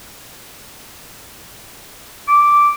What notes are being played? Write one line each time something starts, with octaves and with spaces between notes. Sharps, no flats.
D6